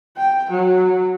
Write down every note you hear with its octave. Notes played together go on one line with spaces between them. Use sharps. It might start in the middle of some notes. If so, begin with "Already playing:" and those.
G5
F#3